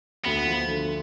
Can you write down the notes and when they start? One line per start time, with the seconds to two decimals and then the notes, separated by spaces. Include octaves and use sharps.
0.25 D2 B3
0.47 F3
0.68 D3